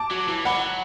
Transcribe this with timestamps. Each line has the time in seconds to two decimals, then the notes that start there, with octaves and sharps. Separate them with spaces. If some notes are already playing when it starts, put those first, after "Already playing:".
Already playing: A5 D6
0.11 F#3
0.28 E3
0.45 F#3 F#5 B5